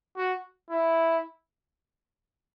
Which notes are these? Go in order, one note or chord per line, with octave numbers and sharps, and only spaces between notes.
F#4
E4